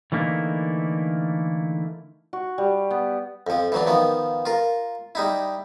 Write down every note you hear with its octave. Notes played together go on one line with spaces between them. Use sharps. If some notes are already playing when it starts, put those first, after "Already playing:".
D3 E3 A3 A#3 D#4 E4
F#4
G3
B3
F2 F3
E3 F#3 D4
D#3 F3 B3
F4 A#4
G3 D#4 E4